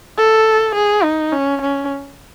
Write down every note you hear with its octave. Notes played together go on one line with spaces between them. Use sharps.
A4
G#4
D#4
C#4
C#4